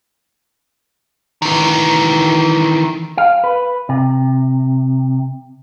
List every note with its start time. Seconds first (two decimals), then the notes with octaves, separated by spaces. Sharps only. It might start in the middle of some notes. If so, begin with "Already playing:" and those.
1.42 D#3 E3
3.17 F5
3.44 B4
3.89 C3